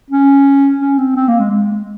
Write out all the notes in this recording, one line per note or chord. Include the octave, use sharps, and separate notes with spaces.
C#4
C#4
C4
C4
A#3
G#3
G#3